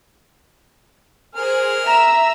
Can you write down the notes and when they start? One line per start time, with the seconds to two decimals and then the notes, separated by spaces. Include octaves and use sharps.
1.35 G#4 A#4 C5 F6
1.87 E5 A#5 E6